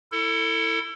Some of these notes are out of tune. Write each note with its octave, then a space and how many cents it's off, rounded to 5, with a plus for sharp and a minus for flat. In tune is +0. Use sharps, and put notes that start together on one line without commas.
E4 +0 A4 +30